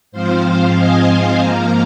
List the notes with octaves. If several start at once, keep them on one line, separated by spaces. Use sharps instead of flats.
G#2 F3 C4 C5 F5
D#5 G#5
G#2 F3 A#3 F5 A#5